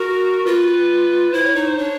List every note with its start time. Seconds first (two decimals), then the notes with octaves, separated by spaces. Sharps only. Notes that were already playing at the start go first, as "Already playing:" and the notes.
Already playing: F#4 A#4
0.46 F4 B4
1.33 E4 C5
1.44 C#5
1.55 D#4 C#5
1.67 C5
1.77 D4 C#5